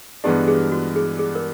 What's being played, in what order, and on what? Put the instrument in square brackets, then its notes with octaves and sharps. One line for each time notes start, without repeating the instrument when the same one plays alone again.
[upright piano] G2 E3 G#3 B3 D4 [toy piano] G4
[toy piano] G#4
F#4
G#4
G#4
A#4